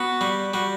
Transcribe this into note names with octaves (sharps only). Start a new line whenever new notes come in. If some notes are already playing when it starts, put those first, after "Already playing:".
Already playing: B3 F#4
G3
G3 F#4